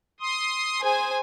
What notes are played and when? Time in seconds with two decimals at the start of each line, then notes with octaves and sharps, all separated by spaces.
0.20 C6 D#6
0.81 G#4 C5 G#5